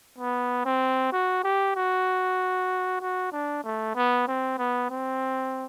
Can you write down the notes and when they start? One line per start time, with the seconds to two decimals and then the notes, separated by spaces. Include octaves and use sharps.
0.18 B3
0.65 C4
1.12 F#4
1.44 G4
1.76 F#4
3.01 F#4
3.32 D4
3.64 A3
3.95 B3
4.27 C4
4.58 B3
4.90 C4